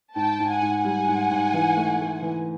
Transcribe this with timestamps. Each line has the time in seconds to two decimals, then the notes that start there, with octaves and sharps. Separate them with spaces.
0.16 G#2 G5 A5
0.40 G#2
0.50 F#5 G#5
0.62 G#2
0.84 G3 F#5 G#5
1.08 G#2
1.31 G#2
1.53 E3
1.76 A3
1.99 A3
2.22 E3